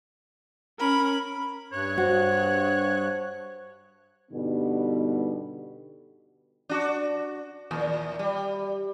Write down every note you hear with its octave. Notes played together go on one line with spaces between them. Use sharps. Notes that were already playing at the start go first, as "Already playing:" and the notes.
C#4 A#4 B5
G2 C#5 F#6
F#4 C5
G2 B2 D3 G3 B3 D#4
D4 F#4
D#2 A#2
G3